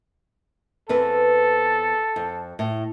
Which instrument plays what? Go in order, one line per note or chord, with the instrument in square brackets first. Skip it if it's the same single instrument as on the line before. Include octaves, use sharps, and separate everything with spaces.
[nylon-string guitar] E2 C4 B4 [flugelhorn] A4
[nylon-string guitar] F2
A2